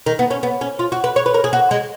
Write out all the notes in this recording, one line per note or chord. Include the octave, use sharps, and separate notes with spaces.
D#3
B3
C#4
B3
C#4
F4
F#4
B4
C#5
B4
A#4
G#4
F#4
G#3